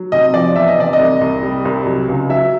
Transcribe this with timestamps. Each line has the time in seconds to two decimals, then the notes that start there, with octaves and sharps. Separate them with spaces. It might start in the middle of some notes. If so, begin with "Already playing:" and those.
Already playing: F#3
0.12 C3 D#5
0.34 F3 D5
0.55 E2 E5
0.68 D#5
0.77 C3 D5
0.93 D#5
0.99 C2
1.21 C2
1.43 G3
1.65 C2
1.87 F#3
2.08 C#2
2.30 F#3 E5